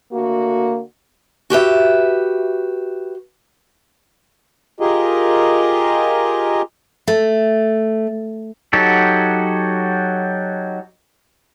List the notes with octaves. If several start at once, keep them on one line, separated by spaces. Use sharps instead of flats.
D3 A3 A#3 F#4
F#4 G4 B4 E5
F4 G4 G#4 A#4 D#5
A3
F#3 D#4 F#4 G4 A4